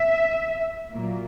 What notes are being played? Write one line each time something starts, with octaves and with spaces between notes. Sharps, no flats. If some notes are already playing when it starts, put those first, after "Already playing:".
Already playing: E5
A#2 F#3 A#3